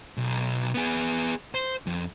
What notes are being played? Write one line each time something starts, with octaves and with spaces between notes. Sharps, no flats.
B1
B3 G#4
C5
F2